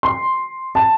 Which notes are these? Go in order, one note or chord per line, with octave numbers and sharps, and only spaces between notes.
C6
A5